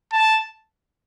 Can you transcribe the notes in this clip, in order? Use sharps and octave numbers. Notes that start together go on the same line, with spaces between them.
A5